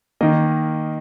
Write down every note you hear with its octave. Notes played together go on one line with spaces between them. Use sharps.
D#3 A#3 D#5